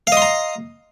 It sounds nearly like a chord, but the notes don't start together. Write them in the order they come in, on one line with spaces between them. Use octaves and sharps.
F5 D#5 C6 A#5